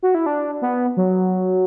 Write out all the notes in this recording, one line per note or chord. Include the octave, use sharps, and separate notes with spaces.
F#4
E4
D4
B3
F#3